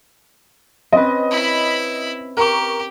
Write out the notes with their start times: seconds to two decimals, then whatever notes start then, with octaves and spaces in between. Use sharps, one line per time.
0.92 C4 C#4 B4 D#5
1.31 E4 B5
2.37 G4 A#4 C#6